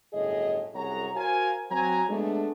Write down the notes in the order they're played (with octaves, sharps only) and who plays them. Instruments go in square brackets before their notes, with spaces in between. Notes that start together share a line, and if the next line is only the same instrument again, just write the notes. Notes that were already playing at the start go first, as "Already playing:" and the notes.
[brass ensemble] G1 F#2 A2 G#4 D#5
C2 F#2 G#4 C#5 F#5 A#5
F#4 A#4 C5 F5 G#5
F#3 C4 G#5 A#5
G#3 A3 B3 D4